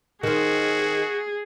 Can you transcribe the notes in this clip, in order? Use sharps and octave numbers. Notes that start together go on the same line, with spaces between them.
D#3 C4 F#4 G#4